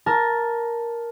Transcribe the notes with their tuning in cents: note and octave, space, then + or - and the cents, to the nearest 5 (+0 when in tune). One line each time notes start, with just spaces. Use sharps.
A#4 +10 A5 +0